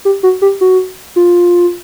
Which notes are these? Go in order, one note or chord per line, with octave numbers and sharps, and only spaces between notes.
G4
F#4
G4
F#4
F4